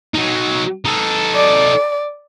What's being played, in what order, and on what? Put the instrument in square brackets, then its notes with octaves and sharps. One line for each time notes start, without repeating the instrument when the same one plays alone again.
[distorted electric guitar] F#3 D#4
D#4 A4
[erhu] D5